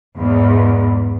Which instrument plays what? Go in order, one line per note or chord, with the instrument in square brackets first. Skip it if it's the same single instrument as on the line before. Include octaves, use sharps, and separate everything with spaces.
[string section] E2 G#2